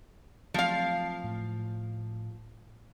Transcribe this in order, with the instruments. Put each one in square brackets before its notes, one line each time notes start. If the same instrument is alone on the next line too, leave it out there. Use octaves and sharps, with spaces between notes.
[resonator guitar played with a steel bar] F3 F5 [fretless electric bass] F#3 A3 C4
[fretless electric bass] A2